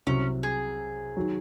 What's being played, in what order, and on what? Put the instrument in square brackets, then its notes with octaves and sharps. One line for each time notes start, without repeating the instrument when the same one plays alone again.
[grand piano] C2 C3 F#3 [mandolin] C#4
[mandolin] G#4
[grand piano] D#3 F#3